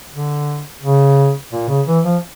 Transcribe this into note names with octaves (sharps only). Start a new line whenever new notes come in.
D3
C#3
A#2
C#3
E3
F3